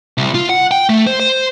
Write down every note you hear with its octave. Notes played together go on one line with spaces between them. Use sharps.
C2
F4
F#5
G5
A3
C5
C5